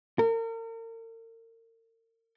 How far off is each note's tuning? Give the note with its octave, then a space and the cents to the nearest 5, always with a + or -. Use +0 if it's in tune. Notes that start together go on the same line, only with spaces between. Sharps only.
A#4 -40